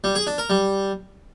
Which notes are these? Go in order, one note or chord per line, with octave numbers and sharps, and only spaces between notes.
G3
G#4
D4
A#4
G3